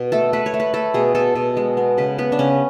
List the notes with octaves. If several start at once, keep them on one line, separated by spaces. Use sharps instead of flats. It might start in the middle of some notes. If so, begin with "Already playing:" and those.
Already playing: B2
A3 A4
A3 B4
C#5
A3
B4
A3 A4
B2 G#4
B2 A4
B2
G#3
B3
C#3 B4
B3 B4
D4
C#3 C#4